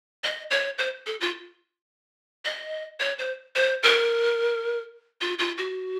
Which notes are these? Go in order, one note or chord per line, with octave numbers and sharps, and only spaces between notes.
D#5
C#5
C5
A4
F4
D#5
C#5
C5
C5
A#4
F4
F4
F#4